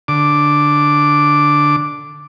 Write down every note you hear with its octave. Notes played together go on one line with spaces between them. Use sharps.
D3 D6